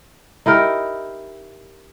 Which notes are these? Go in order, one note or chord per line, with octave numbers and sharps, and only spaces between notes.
D#4 E4 G4 A#4